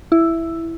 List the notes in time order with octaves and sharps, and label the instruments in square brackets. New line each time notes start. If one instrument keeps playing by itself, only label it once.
[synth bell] E4